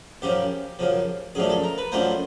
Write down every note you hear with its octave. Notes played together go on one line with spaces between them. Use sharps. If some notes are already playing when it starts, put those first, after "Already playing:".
F#2 C#3 F3 G4
F#2 C#3 F3
F#2 D3 F3 A3 G#4
A4
A#4
B4
F#2 D3 F3 A3 C5